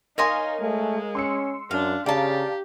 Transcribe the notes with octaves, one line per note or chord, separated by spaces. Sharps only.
D#4 A#4 C#5 D#5 F5 G#5 C6
G#3 A3
C#4 C6 E6 C#7
F#2 D4 F5
C#3 G4 D5 F5 G5 A5 A#5